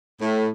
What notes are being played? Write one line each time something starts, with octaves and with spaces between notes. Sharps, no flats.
A2